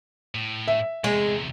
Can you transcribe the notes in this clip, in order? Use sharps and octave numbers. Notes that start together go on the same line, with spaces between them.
A2
E5
E2 C3 G#3